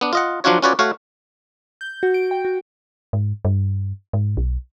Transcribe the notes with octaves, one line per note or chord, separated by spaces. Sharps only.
B3 D4
F4 D#5 F#5
F3 F#3 D4 F4 F#4 C#5
C#4 F4 F#4 B4 C#5 D5
A3 F#4 C#5 F5
G6
F#4
D7
G5
F#4
G#2
G2
G#2
B1